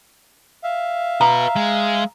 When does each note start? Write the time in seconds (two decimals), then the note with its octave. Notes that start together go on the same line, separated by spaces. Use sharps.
0.64 E5 F5
1.21 F#4 B4 A#5
1.56 G#3